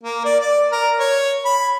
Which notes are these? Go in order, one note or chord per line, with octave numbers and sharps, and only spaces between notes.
A#3
D5
D5
A#4
C#5
B5